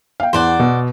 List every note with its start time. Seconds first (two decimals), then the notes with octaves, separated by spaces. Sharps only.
0.20 F5 G5
0.33 E2 E3 C5 D5 F#5
0.60 B2